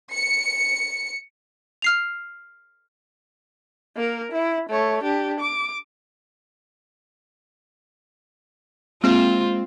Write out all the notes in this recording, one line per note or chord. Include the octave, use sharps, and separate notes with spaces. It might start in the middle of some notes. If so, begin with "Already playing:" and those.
C#7
F6 C7 F7
A#3 A#4
E4
A3 C#5
D4 G4
D6
G#3 A#3 C4 F4